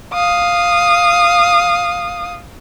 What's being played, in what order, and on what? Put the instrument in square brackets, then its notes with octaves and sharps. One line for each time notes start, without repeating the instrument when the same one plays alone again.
[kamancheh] F5 D#6